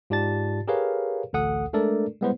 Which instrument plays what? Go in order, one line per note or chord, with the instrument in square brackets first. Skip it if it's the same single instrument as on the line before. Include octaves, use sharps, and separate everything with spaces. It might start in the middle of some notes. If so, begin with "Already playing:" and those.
[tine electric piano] G#2 F4 G4 D5 A5 A6
G4 G#4 A#4 B4 C#5 F5
A1 D2 A4 F#5 D#6
G#3 A3 D4 A4 A#4 D5
G3 G#3 B3 E4 B4 C5